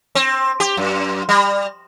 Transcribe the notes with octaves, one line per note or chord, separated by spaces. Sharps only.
C4
G4
F#2
G3